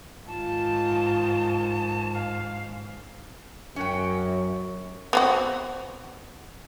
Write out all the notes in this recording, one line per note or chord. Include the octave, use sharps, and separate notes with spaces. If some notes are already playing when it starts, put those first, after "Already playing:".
G#2 D#3 F4 A5
F5
F#2 C#4 F#4 G5
B3 C4 F#4